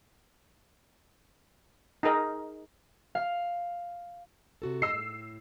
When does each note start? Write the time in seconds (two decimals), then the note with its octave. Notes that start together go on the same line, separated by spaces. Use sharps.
2.03 D#4 G#4 A#4 D#5
3.15 F5
4.62 C3 F#4 A4
4.82 D#5 E6 C7
4.93 A2